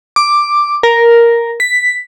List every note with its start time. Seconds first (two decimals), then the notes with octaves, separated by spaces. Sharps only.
0.16 D6
0.83 A#4
1.60 B6